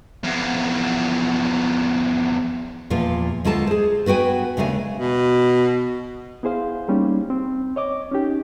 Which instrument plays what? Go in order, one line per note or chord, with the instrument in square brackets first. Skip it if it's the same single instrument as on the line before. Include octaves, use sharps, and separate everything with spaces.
[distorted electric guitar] E2 F3
[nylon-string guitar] E2 A#2 F3 F4
D2 G#3 F4 A4 A5
G#4 C5
B3 F#4 B4 G5 G#5
D#2 C#3 G#3 A3 D4 G#5
[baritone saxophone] B2
[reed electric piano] B3 E4 G#4 C5 F5
G3 A#3 C#4 D#4
C4
C#5 D#5 D6
C#4 D#4 G4